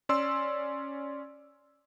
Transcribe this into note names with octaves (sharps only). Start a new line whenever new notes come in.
C#4 D5 C6 E6